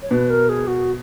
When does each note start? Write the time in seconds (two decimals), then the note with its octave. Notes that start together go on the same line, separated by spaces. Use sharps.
0.02 C#5
0.11 B2 B4
0.30 A#4
0.49 G#4
0.67 F#4